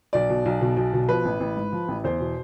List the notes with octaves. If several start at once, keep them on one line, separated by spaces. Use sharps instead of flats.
B1 D5
B2
B1
B2
B1
B2
F3 B4
A1
A1
G#2
F3
A1
E2 C5
B2